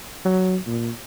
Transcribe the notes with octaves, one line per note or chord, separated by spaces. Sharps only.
F#3
A#2